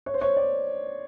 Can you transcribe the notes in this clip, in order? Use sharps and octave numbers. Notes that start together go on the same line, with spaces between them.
C#5
C5
C#5
D5